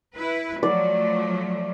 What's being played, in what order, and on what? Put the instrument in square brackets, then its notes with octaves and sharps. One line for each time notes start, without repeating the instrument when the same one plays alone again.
[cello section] E4 B4
[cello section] F3 F#3 A3 [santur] D5